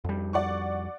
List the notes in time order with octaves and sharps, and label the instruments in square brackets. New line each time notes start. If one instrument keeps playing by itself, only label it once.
[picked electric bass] F2 G3
[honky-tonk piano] D5 F#5 C#6